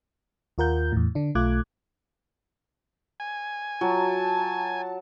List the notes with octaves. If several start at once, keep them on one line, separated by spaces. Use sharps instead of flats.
D#2 F4 A#4 F#5 G6
E2 A2
D3 D4
B1 A3 F4 D6 F#6 G#6
G#5
F#3 F4 F#4 A5